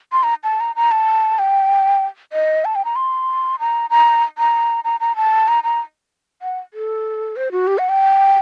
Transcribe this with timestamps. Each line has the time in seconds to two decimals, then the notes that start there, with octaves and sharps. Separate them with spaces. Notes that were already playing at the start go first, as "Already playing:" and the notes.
0.12 C6
0.23 A#5
0.44 A5
0.60 A#5
0.76 A#5
0.91 A5
1.39 G5
2.33 D#5
2.65 A5
2.75 G5
2.85 A#5
2.96 C6
3.59 A#5
3.90 A#5
4.38 A#5
4.84 A#5
5.00 A#5
5.16 A5
5.48 A#5
5.64 A#5
6.42 F#5
6.74 A4
7.36 C5
7.52 F#4
7.67 G4
7.78 F#5
7.89 G5